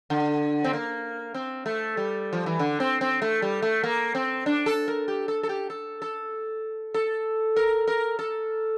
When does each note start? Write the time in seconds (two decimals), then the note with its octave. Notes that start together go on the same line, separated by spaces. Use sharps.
0.10 D3
0.64 C4
0.73 A#3
1.34 C4
1.66 A3
1.97 G3
2.33 F3
2.46 E3
2.59 D3
2.80 C4
3.01 C4
3.22 A3
3.42 G3
3.62 A3
3.84 A#3
4.15 C4
4.46 D4
4.66 A4
4.88 A#4
5.08 G4
5.28 A4
5.43 A4
5.49 G4
5.70 A4
6.02 A4
6.94 A4
7.56 A#4
7.88 A#4
8.19 A4